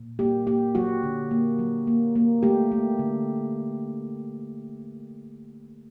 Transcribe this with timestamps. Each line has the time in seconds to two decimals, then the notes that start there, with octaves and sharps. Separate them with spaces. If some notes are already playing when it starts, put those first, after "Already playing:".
Already playing: A#2
0.19 A#3 G4
0.47 A#3 G4
0.75 F#3 F#4
1.03 D3
1.31 A#3
1.59 F#3
1.87 A#3
2.16 A#3
2.43 A3 G4
2.72 A3
2.99 D3